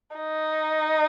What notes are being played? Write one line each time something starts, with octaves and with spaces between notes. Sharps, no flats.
D#4